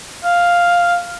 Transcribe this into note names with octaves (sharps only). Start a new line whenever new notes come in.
F5